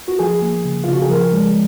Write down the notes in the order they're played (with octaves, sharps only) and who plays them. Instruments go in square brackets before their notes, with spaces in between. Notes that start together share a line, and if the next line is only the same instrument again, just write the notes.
[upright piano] F#4
[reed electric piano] F3 [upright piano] G#4
[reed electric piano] A#3
C#3
[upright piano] F4
[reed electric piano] C#3
[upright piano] F#4
G#4
[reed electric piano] F3 [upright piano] A#4
[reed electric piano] G#3